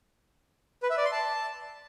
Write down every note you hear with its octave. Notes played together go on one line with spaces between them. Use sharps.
B4
E5
D5
C6
A5